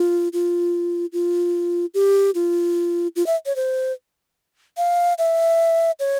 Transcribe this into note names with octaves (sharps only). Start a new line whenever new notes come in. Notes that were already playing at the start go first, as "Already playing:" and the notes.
Already playing: F4
F4
F4
G4
F4
F4
E5
C#5
C5
F5
E5
C#5